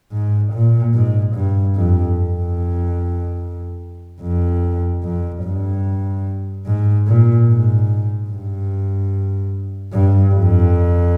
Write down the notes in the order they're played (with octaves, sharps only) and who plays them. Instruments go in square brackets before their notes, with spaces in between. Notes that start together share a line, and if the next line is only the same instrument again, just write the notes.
[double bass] G#2
A#2
G#2
G2
F2
F2
F2
F2
G2
G#2
A#2
G#2
G2
G2
F2